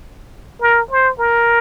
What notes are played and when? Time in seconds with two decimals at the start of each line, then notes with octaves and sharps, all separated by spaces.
0.62 A#4
0.91 C5
1.19 A#4